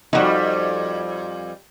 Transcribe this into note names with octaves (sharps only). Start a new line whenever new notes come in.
F2 G3 D#4 F#4